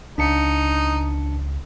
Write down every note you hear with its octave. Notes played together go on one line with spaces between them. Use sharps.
C#2 D4 D#4 A5 C#7